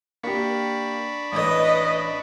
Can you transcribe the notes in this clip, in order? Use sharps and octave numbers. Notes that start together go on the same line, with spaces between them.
A#3 D4 G4 B5 C#6
A1 B4 D#5